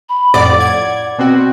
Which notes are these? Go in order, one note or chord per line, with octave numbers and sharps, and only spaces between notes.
B5
F2 A2 D5 F#5
F#5 G#6
B2 C4 F#4 G5